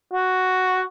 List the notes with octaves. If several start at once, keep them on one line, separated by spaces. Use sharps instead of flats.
F#4